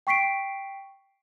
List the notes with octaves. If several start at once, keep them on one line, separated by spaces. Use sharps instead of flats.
G5 C#6 B6 C7 D7